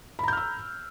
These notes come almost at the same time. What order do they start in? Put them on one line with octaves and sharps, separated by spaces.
B5 A#5 G6 F6 E6